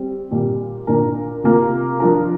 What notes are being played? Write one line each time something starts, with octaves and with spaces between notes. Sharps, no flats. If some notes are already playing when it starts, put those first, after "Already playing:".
Already playing: G3 C4
A#2 G3 A#3
A#2 A#3 D4 A#4
C3 A#3 F4 A#4
F3 D4 F4 A#4